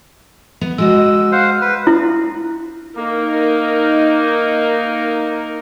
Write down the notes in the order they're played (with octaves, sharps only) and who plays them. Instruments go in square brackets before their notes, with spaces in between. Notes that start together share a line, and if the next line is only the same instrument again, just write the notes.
[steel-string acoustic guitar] B3
[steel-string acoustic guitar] G#3 F#4 D#5 [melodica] E6
[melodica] C5 F5 F#5
B4
[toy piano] E4
[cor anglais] A#3 [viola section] D#4 A#4